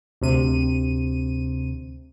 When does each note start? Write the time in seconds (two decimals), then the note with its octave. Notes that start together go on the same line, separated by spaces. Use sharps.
0.21 D2 C3 D#7